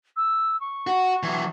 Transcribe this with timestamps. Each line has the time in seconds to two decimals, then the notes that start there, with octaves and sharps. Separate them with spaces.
0.16 E6
0.60 C#6
0.87 F#4
1.23 E3 F#3